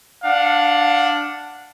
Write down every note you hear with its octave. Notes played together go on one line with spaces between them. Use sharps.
D4 F5 F#5